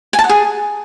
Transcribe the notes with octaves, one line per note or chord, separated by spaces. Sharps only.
G#5
A5
F#5
G#4